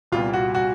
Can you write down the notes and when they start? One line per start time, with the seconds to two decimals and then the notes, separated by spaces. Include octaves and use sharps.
0.12 C2 A#2 G3 B3 F4
0.33 F#4
0.55 F#4